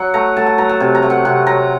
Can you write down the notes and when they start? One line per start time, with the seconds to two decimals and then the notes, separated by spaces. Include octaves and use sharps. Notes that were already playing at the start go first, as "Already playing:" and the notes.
Already playing: F#3 F#5
0.14 A3 A#5
0.37 A3 A5
0.47 F#5
0.58 F#3 A#5
0.69 A5
0.80 C3
0.95 A#5
1.03 A3
1.10 F#5
1.25 C3 F#5
1.47 F#3 A#5